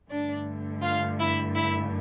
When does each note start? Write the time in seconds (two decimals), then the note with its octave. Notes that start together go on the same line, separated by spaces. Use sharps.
0.10 G2 D3 A3 D4 D5
0.83 F4 F5
1.19 E4 E5
1.55 E4 E5